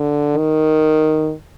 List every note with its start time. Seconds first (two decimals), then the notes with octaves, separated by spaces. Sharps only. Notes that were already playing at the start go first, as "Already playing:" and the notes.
Already playing: D3
0.37 D#3